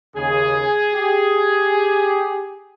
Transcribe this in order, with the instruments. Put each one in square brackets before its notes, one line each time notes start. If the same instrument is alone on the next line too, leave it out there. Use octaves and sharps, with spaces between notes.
[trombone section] D#2 C#3 [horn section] G#4
[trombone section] G4